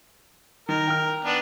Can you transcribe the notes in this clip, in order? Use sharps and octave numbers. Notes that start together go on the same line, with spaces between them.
D#3 A#4
G5 F6
B3 D4